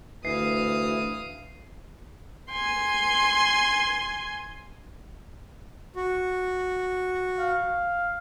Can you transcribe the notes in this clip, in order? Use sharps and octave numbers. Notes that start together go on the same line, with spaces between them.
D2 E3 F5 D#6 C7
G#5 C6
F#4
F5